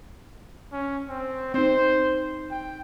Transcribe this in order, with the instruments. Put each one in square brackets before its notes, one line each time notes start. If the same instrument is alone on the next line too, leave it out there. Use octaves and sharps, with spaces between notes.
[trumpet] C#4
C4
[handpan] C4 D#4 [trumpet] C5
[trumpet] G5